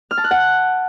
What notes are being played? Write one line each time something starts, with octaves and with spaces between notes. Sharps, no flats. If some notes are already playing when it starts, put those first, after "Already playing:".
F6
A5
F#6
F#5